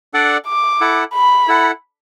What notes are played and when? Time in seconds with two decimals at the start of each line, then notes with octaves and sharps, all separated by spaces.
0.14 D4 A4 D5 F#5
0.47 D6
0.81 E4 A4 F#5
1.14 B5
1.48 E4 A4 F#5